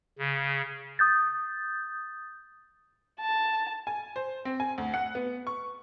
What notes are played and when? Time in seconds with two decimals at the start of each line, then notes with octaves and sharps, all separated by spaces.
0.18 C#3
0.99 D#6 G6 A6
3.20 A5
3.87 G#5
4.16 C5
4.45 C4
4.60 G#5
4.78 D2
4.94 F#5
5.15 B3
5.47 C#6